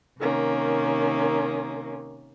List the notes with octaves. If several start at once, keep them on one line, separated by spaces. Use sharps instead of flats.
C3 D#3 A#3 C#4